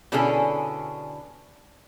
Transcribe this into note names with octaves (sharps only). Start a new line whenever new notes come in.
B2 D3 C#4 E4 G#4 A4